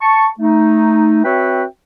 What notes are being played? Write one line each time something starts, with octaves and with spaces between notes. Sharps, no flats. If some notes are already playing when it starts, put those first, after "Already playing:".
A5 C#6
A3 D#4
C4 F#4 B4 C#5 E5 G5